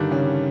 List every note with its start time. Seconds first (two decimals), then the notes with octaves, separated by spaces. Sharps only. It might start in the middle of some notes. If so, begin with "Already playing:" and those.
Already playing: G2 D3 D#3 G3 D4
0.11 C#3 C#4